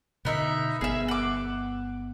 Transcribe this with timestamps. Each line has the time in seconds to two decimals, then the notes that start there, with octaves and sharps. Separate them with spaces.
0.25 B2 D3 B3 D#4 E5
0.81 G1 B3 G#4 E5
1.08 F#5 D6